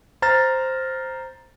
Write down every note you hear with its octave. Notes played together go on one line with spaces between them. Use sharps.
C5 A#5 F6 A6